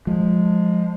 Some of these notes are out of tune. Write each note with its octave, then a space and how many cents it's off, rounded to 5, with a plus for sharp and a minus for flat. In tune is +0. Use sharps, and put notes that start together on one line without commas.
F3 +20 G#3 +0